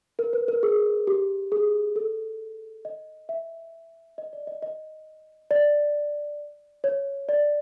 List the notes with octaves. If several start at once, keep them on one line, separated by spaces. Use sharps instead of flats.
A#4
B4
A#4
G#4
G4
G#4
A4
D#5
E5
D#5
D5
D#5
D#5
D5
C#5
D5